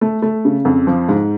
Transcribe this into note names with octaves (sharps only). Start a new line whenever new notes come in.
A3
A3
C#3
F2
F3
G#2